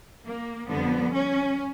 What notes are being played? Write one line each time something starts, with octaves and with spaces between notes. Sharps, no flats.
A#3
F2 D3 G3 B3
C#4